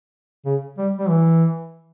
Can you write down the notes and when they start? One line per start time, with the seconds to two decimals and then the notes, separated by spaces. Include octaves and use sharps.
0.45 C#3
0.78 G3
0.99 G3
1.08 E3